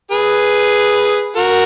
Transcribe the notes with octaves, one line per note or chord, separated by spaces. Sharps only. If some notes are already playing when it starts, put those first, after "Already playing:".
G#4 B4
F#4 A#4